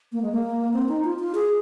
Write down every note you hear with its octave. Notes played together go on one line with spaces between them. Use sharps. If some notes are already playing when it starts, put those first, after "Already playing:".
A#3
G#3
A#3
C4
D#4
F4
F4
G#4